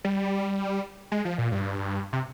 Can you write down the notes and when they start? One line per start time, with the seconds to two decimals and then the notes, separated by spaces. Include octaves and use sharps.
0.04 G3
1.12 G#3
1.25 F3
1.38 A#2
1.52 G2
2.13 C3